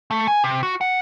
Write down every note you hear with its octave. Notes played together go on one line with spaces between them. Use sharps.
A3
G#5
C3
F#4
F#5